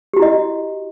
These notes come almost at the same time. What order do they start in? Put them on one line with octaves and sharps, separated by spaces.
G4 F#4 E4 D#5